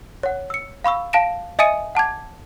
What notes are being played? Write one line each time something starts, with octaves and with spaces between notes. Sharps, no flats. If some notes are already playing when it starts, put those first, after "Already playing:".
C#5 F#5
E6 C#7
F5 B5 C#6 E6
F5 A5 A#6 D7 E7
D#5 E5 G#5 D#6 C#7 D#7
F#5 A5 D6 G#6